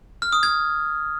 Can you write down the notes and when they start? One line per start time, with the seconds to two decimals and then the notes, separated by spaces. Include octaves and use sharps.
0.22 F6
0.33 D#6
0.43 G#6